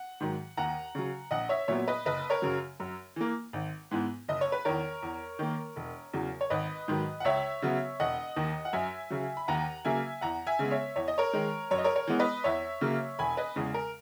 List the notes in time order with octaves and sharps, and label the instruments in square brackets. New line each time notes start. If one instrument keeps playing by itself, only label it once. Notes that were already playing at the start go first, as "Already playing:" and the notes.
Already playing: [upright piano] F#5
G#2 D#3 F#3
D#2 F#5 A#5
C#3 F#3
A#1 D#5 F#5
C#5 E5
A#2 F#3 B3 C#5 E5
B4 D#5
F#1 B4 D#5
A#4 C#5
F#2 C#3 F#3
F#2
E3 A#3
G#1
G#2 E3 B3
F#1 D#5
C#5
B4
E2 D#3 A#4 C#5
E2
D#3 A#3
E1
E2 C#3 F#3
C#5
G#1 B4 D#5
G#2 D#3 F#3
F#5
C#2 C#5 E5
C#3 F#3 B3
E1 D#5 F#5
D#2 D#3
F#5
F#2 E5 G#5
C#3 F#3
B5
D#2 F#5 A#5
C#3 F#3 A#3 E5 G#5
E2 F#5 A#5
E5 G#5
C#3 G#3 B3
C#5 E5
E2 C#5
D#5
A#4 C#5
D#3 G#3
F#2 C#5
D#5
A#4 C#5
A#4 C#5
E3 G#3 B3
B4 D#5
E2 C#5 E5
C#3 F#3 A#3
E1 G#5 B5
B4 D#5
E2 C#3 G#3 G#4
A#4